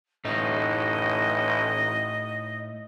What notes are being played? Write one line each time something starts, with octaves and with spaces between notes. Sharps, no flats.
A1 A2 A3 D#4 D#5